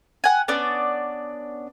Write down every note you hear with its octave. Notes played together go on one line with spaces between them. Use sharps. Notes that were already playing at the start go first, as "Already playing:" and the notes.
F#5 G#5
B3 C#4 D4 D5